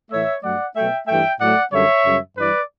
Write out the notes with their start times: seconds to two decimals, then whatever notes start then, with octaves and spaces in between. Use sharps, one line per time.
0.11 A2 E3 A3 C#5 E5
0.43 G2 F#3 A3 D5 F#5
0.76 B2 F#3 A3 E5 G5
1.08 G2 E3 A3 E5 G5
1.41 A2 F#3 A3 D5 F#5
1.73 F#2 D3 G3 C#5 E5
2.05 F#2 C#3 G3
2.37 G2 E3 G3 B4 D5